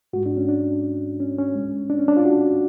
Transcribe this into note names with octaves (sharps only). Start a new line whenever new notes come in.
G#2 G#3 F#4
D4
C#4
D4
C#4
C#4
A2 G#3
D4
C#4
D4
F4
F#4